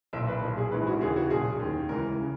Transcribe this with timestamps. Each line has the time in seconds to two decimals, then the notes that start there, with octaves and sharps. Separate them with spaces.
0.13 B1 A#2 E5
0.28 B4
0.42 B1 A#2
0.57 G#4
0.72 A#1 G#2 E3 B4
0.87 F#4
1.01 D#2 C#3 E3 G#4
1.16 F#4
1.30 B1 A#2 G#4
1.60 D#2 D#3
1.89 C#2 C#3 E3 A#4
2.20 C#3